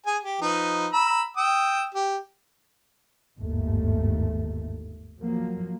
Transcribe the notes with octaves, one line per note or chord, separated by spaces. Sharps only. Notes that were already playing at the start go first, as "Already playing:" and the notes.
G#4 G#5
G4
F3 D#4 B4
A#5 B5 E6
G5 D#6 E6
G4
G1 D#2 G#2 A3
F3 F#3 A#3